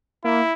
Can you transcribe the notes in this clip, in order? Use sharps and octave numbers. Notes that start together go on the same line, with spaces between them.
A#3 E4